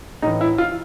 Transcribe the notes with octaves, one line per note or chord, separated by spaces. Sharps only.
A2 E3 D#4
E4
F4